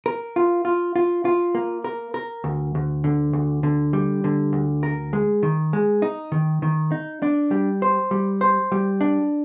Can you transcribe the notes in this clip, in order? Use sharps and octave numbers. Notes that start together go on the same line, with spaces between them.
A#4
F4
F4
F4
F4
A#3
A#4
A#4
D2
D2
D3
D2
D3
G3
D3
D2
A#4
G#3
D#3
G#3
D#4
D#3
D#3
D#4
D4
G3
C5
G3
C5
G3
D4